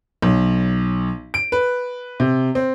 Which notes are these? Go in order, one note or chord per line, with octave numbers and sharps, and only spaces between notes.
B1
D7
B4
C3
C4